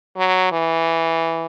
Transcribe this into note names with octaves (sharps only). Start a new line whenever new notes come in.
F#3
E3